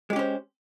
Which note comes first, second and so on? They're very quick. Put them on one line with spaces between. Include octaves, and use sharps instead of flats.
G#3 G4 C#4 C5